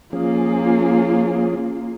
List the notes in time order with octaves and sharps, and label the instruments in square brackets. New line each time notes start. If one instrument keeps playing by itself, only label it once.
[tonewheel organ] F3 C#4 G#4 [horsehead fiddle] A#3 F4